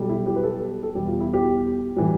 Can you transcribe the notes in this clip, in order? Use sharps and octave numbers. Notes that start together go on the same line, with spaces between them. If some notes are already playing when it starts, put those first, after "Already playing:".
Already playing: B1 B2 G3
E4
G4
B4
A4
A4
E2 B2 G3 G4
F4
E4
G4
A2 E3 G3